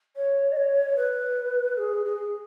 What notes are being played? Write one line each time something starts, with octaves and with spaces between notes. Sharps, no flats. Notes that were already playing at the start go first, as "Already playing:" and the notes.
C#5
D#5
C#5
B4
G#4
G#4